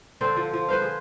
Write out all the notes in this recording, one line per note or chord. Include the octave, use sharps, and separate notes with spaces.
D3 C4 C5
F3
F3
B4 C5 F5
G#4